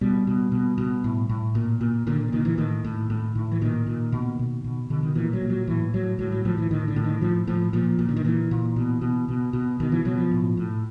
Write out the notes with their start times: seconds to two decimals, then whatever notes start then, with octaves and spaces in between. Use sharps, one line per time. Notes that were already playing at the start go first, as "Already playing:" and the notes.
0.01 B2 G3
0.27 B2
0.52 B2
0.78 B2
1.04 A2
1.29 A2
1.55 A#2
1.81 A#2
2.07 A#2 D3
2.28 D3
2.32 A#2 D#3
2.45 E3
2.58 A2 D#3
2.84 A2
3.10 A2
3.35 A2
3.52 E3
3.61 A#2 D#3
3.87 A#2
4.12 B2
4.39 B2
4.64 B2
4.90 B2 D3
5.03 D#3
5.15 A#2 E3
5.33 F#3
5.42 A#2
5.50 F#3
5.67 A2 E3
5.94 A2 F#3
6.19 A2 F#3
6.32 F#3
6.45 A2 F3
6.58 E3
6.71 A2 D#3
6.88 D3
6.96 A2
7.04 D#3
7.21 A2 F3
7.47 A2 F3
7.73 A#2 F3
7.99 A#2
8.09 D3
8.17 D#3
8.25 A#2 E3
8.51 A#2
8.76 B2
9.02 B2
9.29 B2
9.53 B2
9.80 B2 D#3
9.92 E3
10.05 B2 F#3
10.18 F3
10.31 A2
10.57 A2